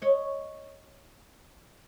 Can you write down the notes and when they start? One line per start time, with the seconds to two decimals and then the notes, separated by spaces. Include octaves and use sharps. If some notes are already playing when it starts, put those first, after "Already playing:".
0.02 C#5 D#5